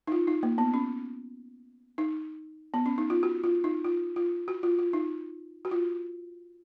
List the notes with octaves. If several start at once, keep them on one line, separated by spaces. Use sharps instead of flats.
D#4
F4
D#4
A#3
B3
C#4
D#4
B3
C#4
D#4
F4
F#4
F4
D#4
F4
F4
F#4
F4
F4
D#4
F#4
F4